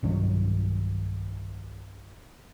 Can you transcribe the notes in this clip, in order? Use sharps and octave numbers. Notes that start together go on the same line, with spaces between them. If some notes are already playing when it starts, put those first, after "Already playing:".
B1 G2 D#3 F#3